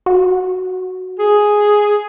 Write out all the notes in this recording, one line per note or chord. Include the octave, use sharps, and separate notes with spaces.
F#4
G#4